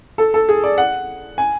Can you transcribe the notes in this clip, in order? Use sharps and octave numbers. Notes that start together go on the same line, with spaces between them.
A4
A4
G#4
D5
F#5
G#5